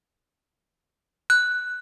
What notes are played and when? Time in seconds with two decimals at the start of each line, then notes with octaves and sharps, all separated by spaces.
1.30 F#6